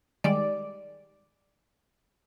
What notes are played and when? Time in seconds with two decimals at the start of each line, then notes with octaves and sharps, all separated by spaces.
0.24 D#3 G3 G#3 D5